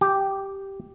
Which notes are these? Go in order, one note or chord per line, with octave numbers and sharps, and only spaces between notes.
G4